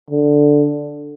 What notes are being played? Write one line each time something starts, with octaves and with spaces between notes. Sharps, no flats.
D3